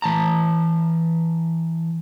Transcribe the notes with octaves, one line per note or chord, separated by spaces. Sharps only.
E3 A5 A#5